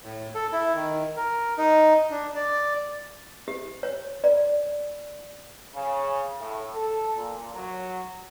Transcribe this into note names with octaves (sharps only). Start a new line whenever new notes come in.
A2
A4
E4
D#3
A#4
D#4
D4
D5
G4
C#5
D5
C#3
A2
A4
A#2
F#3